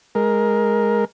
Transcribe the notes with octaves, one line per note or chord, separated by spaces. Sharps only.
G#3 A#4